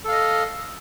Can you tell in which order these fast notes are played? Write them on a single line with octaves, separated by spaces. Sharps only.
A4 F5 D#5